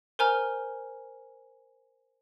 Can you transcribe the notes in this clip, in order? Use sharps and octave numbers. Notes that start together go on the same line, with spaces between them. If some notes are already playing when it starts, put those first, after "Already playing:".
A#4 C5 G#5 A#5 F6